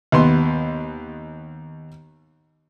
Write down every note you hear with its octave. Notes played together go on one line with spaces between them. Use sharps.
D#2 B3 C6